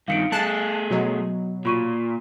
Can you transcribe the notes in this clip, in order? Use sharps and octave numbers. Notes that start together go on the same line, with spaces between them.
G2 D#3 F5 C#7 D7
A3 G#4 A5 F#6
B2 F#3 F#4 D#5
A#2 F4 C#6 D#7